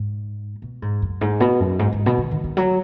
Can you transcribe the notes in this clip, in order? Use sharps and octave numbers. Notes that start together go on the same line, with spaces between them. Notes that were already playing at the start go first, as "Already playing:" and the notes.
Already playing: G#2
B2
G#2
F#2
G#2
B2
F#2
G#2
G#2
B2
D#3
D#3
D#3
F#3